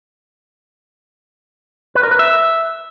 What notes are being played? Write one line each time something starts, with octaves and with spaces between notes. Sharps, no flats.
B4
A#4
B4
E5